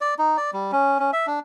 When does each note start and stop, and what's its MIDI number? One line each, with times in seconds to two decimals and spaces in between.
0.01 0.14 74
0.19 0.37 63
0.37 0.51 74
0.53 0.71 55
0.72 0.99 61
0.99 1.11 61
1.13 1.26 76
1.27 1.40 62